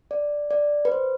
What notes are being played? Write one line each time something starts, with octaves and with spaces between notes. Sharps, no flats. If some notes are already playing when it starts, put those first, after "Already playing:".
D5
D5
B4
C5